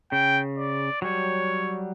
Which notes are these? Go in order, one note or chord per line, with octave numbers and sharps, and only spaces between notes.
C#3 G5
D5
F#3 G3 C#5